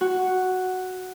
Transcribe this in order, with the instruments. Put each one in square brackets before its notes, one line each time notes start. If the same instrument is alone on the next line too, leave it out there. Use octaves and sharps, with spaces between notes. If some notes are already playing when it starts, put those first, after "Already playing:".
[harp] F#4